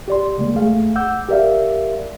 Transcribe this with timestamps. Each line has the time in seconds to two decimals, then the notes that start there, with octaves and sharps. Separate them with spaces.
0.08 G4 D5 C6
0.37 C#3 G#3 A#3
0.54 E2 A3 G#4 F5
0.96 F#5 D6 E6 G6
1.29 G4 A#4 D5 E5 F5